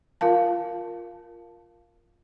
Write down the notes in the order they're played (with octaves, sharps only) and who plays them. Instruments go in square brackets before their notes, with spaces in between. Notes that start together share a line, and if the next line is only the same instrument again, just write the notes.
[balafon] F4 A#4 F5 A5